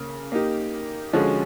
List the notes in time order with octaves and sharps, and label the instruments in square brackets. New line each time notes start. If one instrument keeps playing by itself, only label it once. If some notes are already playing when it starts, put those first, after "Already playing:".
Already playing: [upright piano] C#3 A#3
A#3 D#4 G4
D3 F3 G#3 C#4 F#4